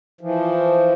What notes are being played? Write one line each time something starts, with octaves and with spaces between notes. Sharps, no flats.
E3 F3